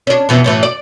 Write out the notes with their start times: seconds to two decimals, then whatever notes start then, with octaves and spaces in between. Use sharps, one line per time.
0.07 C#4 D4
0.29 F2 B2 E3
0.44 F#2 A2 E3
0.63 D5